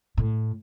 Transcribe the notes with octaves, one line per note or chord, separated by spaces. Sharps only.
A2